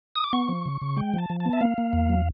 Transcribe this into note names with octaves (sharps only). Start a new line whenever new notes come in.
D#6
D6
B3 C#6
F3
C#3
C#3
G#3 G5
F3 A5
F3
A5
B3
E5
A#3 F5
A#3
E2
F#3